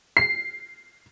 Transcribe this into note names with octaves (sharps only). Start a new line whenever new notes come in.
C7